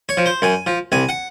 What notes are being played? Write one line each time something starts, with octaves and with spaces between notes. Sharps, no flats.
C#5
F3
C5
F#2 G#5
F3
C2 G#5
F#5